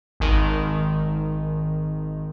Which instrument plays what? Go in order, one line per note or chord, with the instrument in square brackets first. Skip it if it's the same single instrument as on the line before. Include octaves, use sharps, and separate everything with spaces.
[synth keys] G#1 D#3